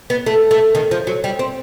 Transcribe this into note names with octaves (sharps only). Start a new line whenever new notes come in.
B3
A3
A3
D#3
F3
F#3
G3
C4